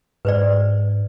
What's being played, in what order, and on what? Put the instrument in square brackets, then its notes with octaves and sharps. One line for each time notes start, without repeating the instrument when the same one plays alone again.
[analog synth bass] G#2 [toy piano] B4 C5 D5